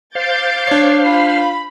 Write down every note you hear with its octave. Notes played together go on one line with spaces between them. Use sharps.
C5 F5 D6 G6 A6
D4 C#5 C7
F4 B5